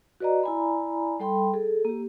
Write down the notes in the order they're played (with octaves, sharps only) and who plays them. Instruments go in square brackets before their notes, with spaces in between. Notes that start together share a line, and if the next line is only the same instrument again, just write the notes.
[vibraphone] F#4 B4 D5 D#5 A#5
E4 D5 G#5 A#5 B5
G3 A4 G5 B5 C6
G#4 A4
A#3 G4